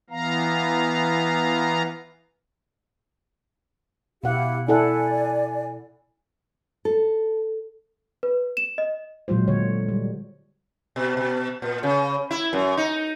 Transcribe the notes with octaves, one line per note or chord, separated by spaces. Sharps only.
E3 B3 F5 A#5
B2 E4 G4 F5 F#5
E4 A4 D5 F#5 G#5
A4
B4
E7
D#5
A#2 F#3 G#3 F4 C5
D3 C#5
G3
B2
B2
A#2
C#3
E4
F#2
D#4